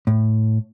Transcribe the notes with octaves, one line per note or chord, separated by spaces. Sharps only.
A2